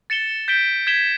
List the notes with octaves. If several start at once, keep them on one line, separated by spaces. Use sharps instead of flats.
A6 C#7 E7 G7
G6 B6 D7 G7
G#6 B6 E7 G7